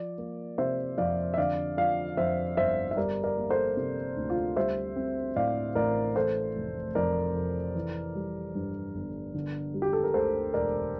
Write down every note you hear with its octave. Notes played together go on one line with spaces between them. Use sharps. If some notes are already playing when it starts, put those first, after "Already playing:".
Already playing: F3 D5
A#3
C3 C5 E5
F2 D5 F5
E5
D3 D5 F5
F3 D5 F5
F2 C5 E5
G1 C5 E5
E5
G3 A#4 D5
A#4 D5
A#3
A4 C5
C3
D2
F4
G3 C5 E5
C4
A2 D5 F5
A1 A#4 D5
E3 A4 C5
F1
F2 A#4 D5
F1
E3
G3
G2
G1
D3
G3
G4
A4
A#4
D2 A4 C5
E1 A#4 D5